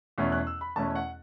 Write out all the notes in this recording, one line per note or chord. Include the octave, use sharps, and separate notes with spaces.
E2 B2 A3 C#4 E4
F#6
E6
B5
E2 B2 A3 C#4 E4 A5
F#5